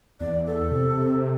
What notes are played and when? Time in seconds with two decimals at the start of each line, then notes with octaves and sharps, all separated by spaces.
0.20 E2 D5
0.46 A4
0.71 C3